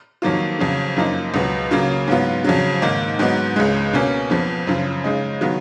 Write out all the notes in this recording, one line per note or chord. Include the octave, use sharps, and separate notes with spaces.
F2 D#3 F#3 A#3 F4
F2 C#3 F#3
F#2 F3 A#3 D#4
C#2 B2 F#3 B3
C#3 F#3 A#3 F4
G#2 F#3 B3 F4
F2 C#3 F#3
G#2 D#3 A#3 D#4
G#2 F#3 B3 D#4
C#2 C#3 G#3
B2 A#3 C#4
F2 F3 B3
F#2 C#3 F3
C#3 G#3 D#4
D#3 F#3 B3 F4